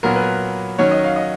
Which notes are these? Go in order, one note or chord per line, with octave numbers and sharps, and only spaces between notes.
A#2 F#3 B3 A#4
B4
A#4
D#3 F#3 C#4 C#5
D#5
F5
D#5